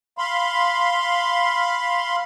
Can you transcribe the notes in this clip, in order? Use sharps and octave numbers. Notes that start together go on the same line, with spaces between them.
F5 B5 C6